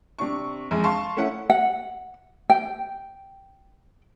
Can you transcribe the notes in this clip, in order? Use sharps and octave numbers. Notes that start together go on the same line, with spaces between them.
C3 D4 C#6
A#1 F2 G#3
F5 A5 C6 C#6
A3 C#4 E4 F#5
F#5
G5